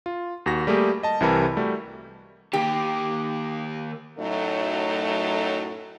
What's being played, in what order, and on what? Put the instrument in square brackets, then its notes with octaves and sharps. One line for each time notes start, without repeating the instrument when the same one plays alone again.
[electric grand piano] F4
D#2 F#4 A#6
G3 A3 A#3 G4 G#4
D#5 A5
C2 C3 E3 A#4 A5 B5
G3 A3 F#4
[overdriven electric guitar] D#3 A#3 [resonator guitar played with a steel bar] G4
[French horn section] F#2 A2 F#3 A3 D#4